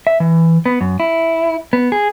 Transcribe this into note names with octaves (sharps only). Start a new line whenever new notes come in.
E5
E3
B3
F#2
E4
B3
G#4